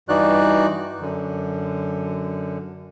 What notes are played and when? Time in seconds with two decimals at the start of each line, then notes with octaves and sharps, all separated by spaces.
0.09 G2 E3 D#4 F#4 D5 F#6
1.00 F#2 D3